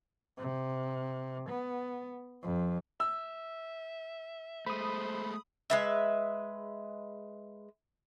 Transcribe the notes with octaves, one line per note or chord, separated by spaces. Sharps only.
C3
B3
F2
E5 E6
G#3 A3 C5 B5 D#6
G#3 B4 E5